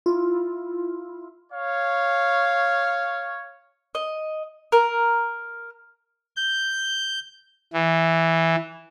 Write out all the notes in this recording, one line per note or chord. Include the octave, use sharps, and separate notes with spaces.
E4 F4
C#5 F5
D#5
A#4
G6
E3